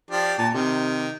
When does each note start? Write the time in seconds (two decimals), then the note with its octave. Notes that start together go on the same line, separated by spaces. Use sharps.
0.11 F3 D4 G4
0.38 A#2 A5
0.54 C3 D#3